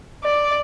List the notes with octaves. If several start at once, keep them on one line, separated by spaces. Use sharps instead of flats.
D5